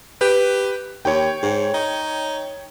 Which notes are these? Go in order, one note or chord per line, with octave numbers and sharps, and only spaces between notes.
G4 B4
D#2 C#5 G5
G#2
D#4